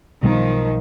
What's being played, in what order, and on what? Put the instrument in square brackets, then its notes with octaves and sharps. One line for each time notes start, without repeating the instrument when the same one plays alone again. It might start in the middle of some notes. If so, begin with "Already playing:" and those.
[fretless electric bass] B1 B2 G3 B3 [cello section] D#3 F3